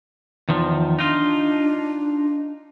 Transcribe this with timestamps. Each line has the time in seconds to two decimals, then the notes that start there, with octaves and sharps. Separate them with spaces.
0.49 E2 D#3 F3
0.99 D4 D#4 F4